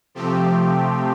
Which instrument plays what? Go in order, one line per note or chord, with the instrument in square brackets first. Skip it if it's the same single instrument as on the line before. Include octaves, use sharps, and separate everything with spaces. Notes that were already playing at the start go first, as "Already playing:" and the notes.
[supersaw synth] C3 F3 A3 C4 G4